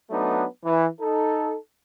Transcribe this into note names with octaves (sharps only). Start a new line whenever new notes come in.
F#3 A3 B3 D4 D#4
E3
D#4 A4